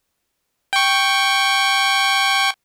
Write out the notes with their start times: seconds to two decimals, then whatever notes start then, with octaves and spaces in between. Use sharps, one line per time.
0.73 G5 C#6